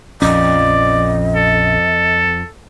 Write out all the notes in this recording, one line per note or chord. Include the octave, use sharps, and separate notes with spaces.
A#1 F2 C#4 D5 D#5
A4